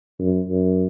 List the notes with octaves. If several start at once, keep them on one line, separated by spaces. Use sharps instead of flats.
F#2
F#2